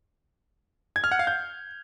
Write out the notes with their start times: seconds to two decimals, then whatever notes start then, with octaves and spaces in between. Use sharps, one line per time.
0.96 G#6
1.04 F6
1.12 F#5
1.19 F5
1.27 G6